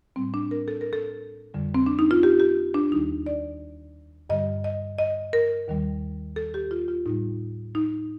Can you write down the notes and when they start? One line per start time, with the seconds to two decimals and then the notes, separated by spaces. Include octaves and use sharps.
0.16 A2 G3 C4
0.34 D4
0.51 A#4
0.68 A4
0.81 A#4
0.93 A4
1.54 F2 D3 G3
1.75 C4
1.86 D4
1.99 D#4
2.11 F4
2.23 G4
2.40 G4
2.74 D4
2.92 D#2 D#3 G3 D#4
3.26 D5
4.30 G2 D3 G3 D#5
4.64 D#5
4.98 D#5
5.33 A#4
5.68 D#2 D#3 G3
6.36 A4
6.54 G4
6.71 F4
6.88 F4
7.06 A2 G3 D#4
7.75 D#4